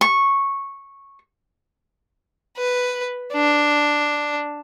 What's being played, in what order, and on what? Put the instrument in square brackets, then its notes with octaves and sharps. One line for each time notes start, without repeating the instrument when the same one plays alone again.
[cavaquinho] C#6
[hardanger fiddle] B4
D4